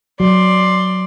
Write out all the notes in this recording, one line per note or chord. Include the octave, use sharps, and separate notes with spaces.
F#3 D5 C6